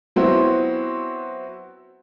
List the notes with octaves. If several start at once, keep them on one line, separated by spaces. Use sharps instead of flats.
F#3 B3 C4 E4 F#4